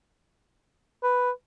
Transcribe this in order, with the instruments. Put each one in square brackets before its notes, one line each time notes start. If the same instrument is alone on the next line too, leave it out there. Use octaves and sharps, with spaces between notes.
[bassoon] B4